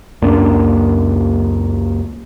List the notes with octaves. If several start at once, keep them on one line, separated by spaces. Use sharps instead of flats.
C#2 F#2 A#3 D4